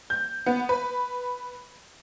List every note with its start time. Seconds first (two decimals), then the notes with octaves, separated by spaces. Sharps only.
0.10 G6
0.46 B3
0.69 B4